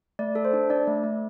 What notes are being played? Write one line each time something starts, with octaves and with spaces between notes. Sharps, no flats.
A3 D5
A4
C5
D4
D4 D5
A3
A3